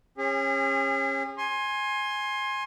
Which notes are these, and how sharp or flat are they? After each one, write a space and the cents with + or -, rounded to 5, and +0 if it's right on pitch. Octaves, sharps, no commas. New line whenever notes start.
C#4 -25 G#4 -40
G#5 +0 C6 +25